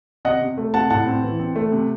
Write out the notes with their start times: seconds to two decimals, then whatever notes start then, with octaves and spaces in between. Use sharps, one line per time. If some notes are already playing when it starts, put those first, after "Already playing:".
0.25 C3 D#5 F#5
0.42 C3
0.58 A3
0.74 C3 F#5 A5
0.90 A2 F#5 A5
1.07 C4
1.23 E3
1.39 C4
1.56 A3
1.72 C3